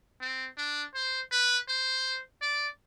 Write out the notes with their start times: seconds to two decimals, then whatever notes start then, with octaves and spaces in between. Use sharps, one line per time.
0.21 C4
0.57 D4
0.94 C5
1.32 B4
1.68 C5
2.41 D5